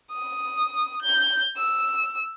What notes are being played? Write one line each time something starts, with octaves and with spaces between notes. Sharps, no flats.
D#6
G6
E6